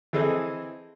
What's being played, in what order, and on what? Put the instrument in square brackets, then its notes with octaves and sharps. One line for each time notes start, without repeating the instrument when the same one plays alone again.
[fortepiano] E3 C4 G#4 A4 D#5